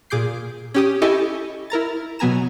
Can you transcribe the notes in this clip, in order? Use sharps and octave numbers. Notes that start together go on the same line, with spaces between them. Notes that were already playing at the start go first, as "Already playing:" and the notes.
A#2 G#4 D6 G6 C7
C#4 G4 D#6
E4 G4 A4 D#5 G#5 C#6
E4 A#4 A#5 A6
B2 F#3 B3 G#5 A#5 E7